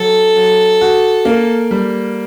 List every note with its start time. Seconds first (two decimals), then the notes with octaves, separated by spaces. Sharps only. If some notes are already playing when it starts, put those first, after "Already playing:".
Already playing: F#3 A4
0.36 F#3
0.81 F#4
1.25 A#3
1.71 G3